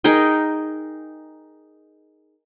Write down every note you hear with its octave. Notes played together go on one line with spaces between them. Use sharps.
D#4 G#4 A#4 G5